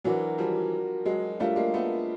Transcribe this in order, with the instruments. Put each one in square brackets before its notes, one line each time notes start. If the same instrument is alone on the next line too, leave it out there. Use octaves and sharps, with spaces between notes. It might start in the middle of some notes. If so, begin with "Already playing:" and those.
[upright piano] E3 F#3 [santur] D4 F#4 A#4 D5
[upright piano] F3 G3
F#3 G#3
[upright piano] G3 A3 [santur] D4 F4 A#4 C#5
[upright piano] G#3 A#3
A3 B3